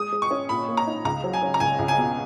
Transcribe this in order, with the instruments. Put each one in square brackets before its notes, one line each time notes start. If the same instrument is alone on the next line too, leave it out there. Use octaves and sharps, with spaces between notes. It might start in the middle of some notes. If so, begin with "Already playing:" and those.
Already playing: [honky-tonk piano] G#3 [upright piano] D#6
[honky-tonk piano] G#3
[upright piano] C#6
[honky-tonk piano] C#4
[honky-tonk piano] A#2 [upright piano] B5
[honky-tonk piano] A#3
[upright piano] A#5
[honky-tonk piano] D#4
[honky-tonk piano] C#2 [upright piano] A#5
[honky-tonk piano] F#3
[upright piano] G#5
[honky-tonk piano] C#4
[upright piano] A#5
[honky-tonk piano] C#2 [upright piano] G#5
[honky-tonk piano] C#2
[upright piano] G#5
[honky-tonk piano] B2